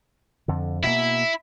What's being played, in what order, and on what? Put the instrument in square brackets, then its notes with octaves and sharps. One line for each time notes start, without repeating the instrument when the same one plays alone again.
[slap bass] F2 D3
[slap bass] B2 A#3 [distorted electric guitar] E4 E5